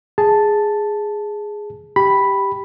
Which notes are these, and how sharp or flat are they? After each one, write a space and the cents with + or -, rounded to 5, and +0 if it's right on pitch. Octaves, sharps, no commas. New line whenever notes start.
G#4 +0 A5 +0
G4 +0 B5 +0